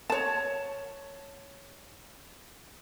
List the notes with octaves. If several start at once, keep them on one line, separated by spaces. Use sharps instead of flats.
C#5 A5